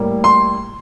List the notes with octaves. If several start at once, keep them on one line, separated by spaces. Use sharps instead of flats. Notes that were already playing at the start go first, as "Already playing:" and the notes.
Already playing: A2 G3 A#3
C6